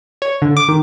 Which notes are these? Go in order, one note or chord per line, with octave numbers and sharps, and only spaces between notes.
C#5
D3
D6
D#3